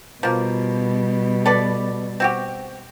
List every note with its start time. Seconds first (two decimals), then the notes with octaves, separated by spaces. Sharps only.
0.23 B2 F3 G3 A#3
1.46 A4 B4 D5
2.20 C4 F#4 G4